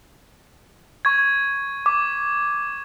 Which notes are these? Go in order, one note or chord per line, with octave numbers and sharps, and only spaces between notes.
C#6 G#6
D6